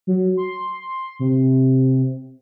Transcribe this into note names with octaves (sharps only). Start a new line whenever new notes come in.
F#3
C6
C3